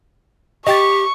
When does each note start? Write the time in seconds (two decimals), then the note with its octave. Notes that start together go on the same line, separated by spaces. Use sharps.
0.67 G4 D#5 G5 C#6 A6